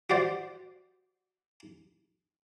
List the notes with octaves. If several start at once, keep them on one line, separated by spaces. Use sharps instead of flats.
F#4 G4 C5 D5